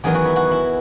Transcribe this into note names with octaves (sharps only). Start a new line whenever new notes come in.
E2 D#3 F#3 B3 G#4
F#4
E4
F#4
E4